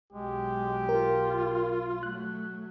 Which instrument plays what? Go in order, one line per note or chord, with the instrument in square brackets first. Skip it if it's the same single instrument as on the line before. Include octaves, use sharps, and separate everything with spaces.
[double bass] B1 F#3 [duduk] G#3 [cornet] G4
[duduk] F4 [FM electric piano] A#4
[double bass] F#3 A3 [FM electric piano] F#6